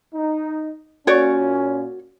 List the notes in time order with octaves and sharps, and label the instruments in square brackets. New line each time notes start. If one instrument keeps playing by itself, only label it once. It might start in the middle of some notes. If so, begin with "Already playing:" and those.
[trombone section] D#4
[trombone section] A#2 C#4 [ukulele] F#4 C#5 D5